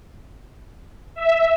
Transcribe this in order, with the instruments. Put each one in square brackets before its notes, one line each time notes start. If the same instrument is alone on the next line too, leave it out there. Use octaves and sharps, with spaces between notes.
[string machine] E5